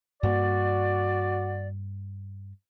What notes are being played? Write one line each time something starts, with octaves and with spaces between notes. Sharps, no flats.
G2 A#3 F#4 D5